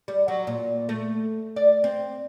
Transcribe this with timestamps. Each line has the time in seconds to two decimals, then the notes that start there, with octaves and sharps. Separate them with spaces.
0.08 G3
0.28 F#3
0.47 A#2
0.89 A3
1.56 D5
1.84 C4